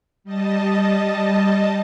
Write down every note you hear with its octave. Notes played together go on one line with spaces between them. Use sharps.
G3 D#5 A5